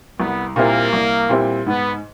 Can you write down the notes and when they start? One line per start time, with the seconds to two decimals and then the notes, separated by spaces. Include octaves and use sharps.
0.19 C2 B3
0.56 A#2 G3 A#3 C4 E4
0.93 C2
1.29 A#2 G3 C4 E4
1.66 G#2 B3